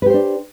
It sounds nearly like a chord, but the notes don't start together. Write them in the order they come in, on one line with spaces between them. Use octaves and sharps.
B4 G4 C5 D4